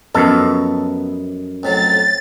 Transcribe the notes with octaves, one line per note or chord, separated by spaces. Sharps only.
F#2 F3 B3 C#4 A4 D#5
F2 A2 F#3 A6